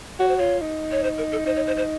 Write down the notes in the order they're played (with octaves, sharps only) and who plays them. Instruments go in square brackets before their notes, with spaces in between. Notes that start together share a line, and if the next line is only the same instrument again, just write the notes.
[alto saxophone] F#4 [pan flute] C#5
[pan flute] C5
[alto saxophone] F4 [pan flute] C#5
[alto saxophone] D#4
[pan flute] C#5
C5
A#4
A4
[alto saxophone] D#4 [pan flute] C5
[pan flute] C#5
C5
C5